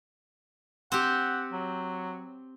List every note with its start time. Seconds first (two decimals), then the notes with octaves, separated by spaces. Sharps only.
0.92 C4 G4 F#5
1.52 F#3